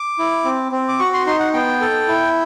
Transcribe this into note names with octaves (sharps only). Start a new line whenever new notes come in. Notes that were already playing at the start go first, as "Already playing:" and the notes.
Already playing: D6
E4
C4
C4
D6
F#4 C#6
C6
D#4 C6
F#5
B3 G5
A4
E4